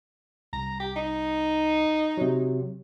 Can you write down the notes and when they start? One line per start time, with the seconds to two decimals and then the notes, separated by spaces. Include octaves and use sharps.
0.53 C2 A#5
0.80 G4
0.96 D#4
2.17 C3 F#3